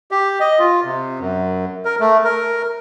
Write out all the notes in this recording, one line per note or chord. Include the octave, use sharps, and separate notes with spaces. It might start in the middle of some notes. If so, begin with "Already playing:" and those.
G4
D#5
F4
C3
F#2
A#4
A3
A#4